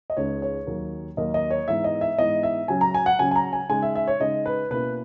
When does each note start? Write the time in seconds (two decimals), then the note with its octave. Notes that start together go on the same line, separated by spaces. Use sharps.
0.10 D#5
0.17 C#2 C#3 G#3 D#4 C#5
0.42 C#5
0.67 D#2 D#3 F#3 A#3
1.17 D#2 D#3 F#3 A#3 D#5
1.34 D#5
1.51 C#5
1.68 G#2 E3 B3 E5
1.84 D#5
2.01 E5
2.18 G#2 E3 B3 D#5
2.43 E5
2.68 C#3 F#3 C#4 G#5
2.81 A#5
2.94 G#5
3.06 F#5
3.19 C#3 F#3 C#4 G#5
3.31 G#5
3.36 A#5
3.53 G#5
3.69 C#3 G#3 D#4 G#5
3.83 E5
3.95 E5
4.07 C#5
4.20 C#3 G#3 D#4 D#5
4.46 B4
4.70 B2 A#3 C#4 E4 B4